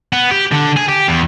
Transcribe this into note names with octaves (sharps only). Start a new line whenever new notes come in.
B3
G4
D3
G#4
G4
E2